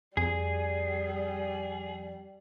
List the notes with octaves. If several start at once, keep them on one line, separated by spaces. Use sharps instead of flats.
F2 G3 G#4